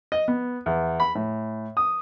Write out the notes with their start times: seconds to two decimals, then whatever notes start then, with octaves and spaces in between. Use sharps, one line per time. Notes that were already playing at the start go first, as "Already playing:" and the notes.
0.12 D#5
0.28 B3
0.66 E2
1.00 B5
1.15 A2
1.77 D#6